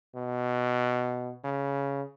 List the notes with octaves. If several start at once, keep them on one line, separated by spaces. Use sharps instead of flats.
B2
C#3